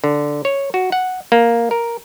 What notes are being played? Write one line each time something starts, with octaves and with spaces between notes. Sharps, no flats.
D3
C#5
F#4
F#5
A#3
A#4